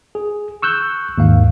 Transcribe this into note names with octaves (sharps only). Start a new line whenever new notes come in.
G#4
C#6 E6 F#6 G6
D#2 G#2 F5